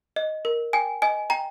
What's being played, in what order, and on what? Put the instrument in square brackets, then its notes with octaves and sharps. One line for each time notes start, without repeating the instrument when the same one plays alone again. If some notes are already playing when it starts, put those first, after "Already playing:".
[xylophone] D#5
A#4
G5 G#5
D#5 G#5
G5 A#5